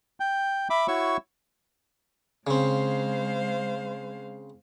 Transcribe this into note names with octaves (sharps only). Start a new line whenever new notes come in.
G5
E5 B5 D6
E4 F#4 C#5 C#6 E6
C#3 G#3 C4 C5 F5